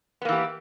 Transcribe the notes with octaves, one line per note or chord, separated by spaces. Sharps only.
E3 A#3 B3 G4